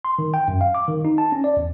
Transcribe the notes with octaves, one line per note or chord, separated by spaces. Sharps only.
C6
D#3
G5
F#2
F5
D6
D#3
D#4
A5
C#4
D5
E2